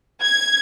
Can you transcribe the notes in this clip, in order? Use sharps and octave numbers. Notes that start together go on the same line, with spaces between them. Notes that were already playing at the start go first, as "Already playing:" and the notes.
G#6